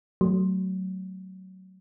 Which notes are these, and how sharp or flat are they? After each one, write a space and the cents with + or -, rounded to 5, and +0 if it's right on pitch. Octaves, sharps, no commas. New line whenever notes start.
F#3 +15 A3 +0